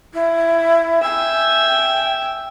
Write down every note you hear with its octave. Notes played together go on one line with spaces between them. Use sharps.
E4
E5 G5 G#5